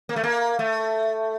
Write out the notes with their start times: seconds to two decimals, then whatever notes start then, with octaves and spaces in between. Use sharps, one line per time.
0.09 A#3
0.16 A3
0.23 A#3
0.59 A3